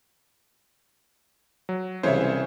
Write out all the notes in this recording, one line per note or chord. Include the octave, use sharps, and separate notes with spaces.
F#3
C2 C#3 E3 C5 C#5 E5